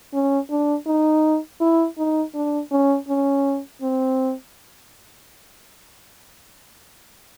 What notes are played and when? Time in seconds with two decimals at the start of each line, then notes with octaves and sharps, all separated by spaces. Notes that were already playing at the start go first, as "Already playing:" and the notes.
0.13 C#4
0.50 D4
0.86 D#4
1.60 E4
1.98 D#4
2.34 D4
2.71 C#4
3.08 C#4
3.82 C4